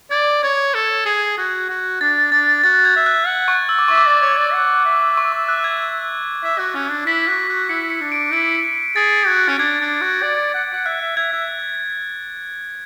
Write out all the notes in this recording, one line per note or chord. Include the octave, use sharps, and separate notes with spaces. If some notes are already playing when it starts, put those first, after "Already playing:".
D5 G#6
C#5 G#6
A4
G#4
F#4
F#4
D4 A6
D4 A6
F#4 A6
G#6
E5
F#6
F#5
C#6
E6
D6
E5 C#6
D6
D5
C#5
D5
F#5
E5
C#6
D6
F#6
G#6
E5
F#4
C#4
D4
E4 B6
F#4
F#4
E4 C#7
C#7
D4
D7
E4 D7
G#4 A6
F#4 G#6
C#4
D4 G#6
D4
F#4
D5
F#5
F#5
E5 F#6
E5
E5 G#6
E5